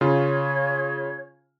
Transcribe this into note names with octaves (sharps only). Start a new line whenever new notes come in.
C#3 F4 C#5